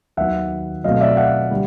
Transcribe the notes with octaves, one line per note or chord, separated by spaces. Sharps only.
D#2 D#3 F#3 B3 E5 F#5
B2 F#3 A3 C4 D#5 F5
D5 E5
F5
E5 F#5
D3 G3